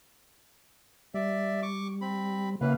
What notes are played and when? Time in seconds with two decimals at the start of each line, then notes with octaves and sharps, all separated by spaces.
1.14 G3 D5 E5
1.62 C#6 D6
2.01 C4 B5
2.61 C#3 E3 F#3 A#3 B4 F5